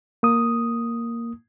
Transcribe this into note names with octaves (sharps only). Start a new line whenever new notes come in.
A#3 D#6